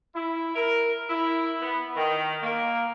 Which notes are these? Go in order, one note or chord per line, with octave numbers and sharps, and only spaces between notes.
E4
A#4
E4
B3
D#3
A#3